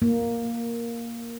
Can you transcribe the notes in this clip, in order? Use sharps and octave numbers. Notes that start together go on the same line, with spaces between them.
A#3